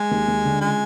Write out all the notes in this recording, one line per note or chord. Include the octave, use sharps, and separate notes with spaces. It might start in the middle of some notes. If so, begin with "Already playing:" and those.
Already playing: G#3
D#2
D#2
D3
C#2 G#3